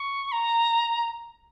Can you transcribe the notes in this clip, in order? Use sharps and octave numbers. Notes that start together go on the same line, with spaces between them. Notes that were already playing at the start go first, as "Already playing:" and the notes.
Already playing: C#6
A#5